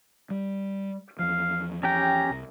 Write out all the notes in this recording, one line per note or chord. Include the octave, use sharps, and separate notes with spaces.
G3
E2 F3 F5
C#4 G4 G5 A#5
C2